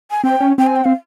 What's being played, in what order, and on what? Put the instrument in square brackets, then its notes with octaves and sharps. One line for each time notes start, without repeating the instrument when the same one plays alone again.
[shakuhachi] G#5
[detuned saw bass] C4 [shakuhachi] G5
[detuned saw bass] C#4
[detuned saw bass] C4 [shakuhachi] G5
[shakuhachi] G#5
G5
[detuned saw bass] C4 [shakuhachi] F5